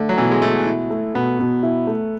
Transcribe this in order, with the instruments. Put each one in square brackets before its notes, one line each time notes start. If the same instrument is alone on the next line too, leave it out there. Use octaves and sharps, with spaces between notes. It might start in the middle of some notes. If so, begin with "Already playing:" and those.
Already playing: [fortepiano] D3 [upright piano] A3
[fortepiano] F#3
[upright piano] B2 [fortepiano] E3
[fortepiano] G#3
[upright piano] B2 [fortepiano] A3
[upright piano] E4
A3
[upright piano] B2 [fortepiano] B3
[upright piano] B2
E4
A3